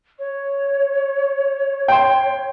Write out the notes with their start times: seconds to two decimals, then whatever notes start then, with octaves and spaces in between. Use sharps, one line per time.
0.18 C#5
1.88 G5 C6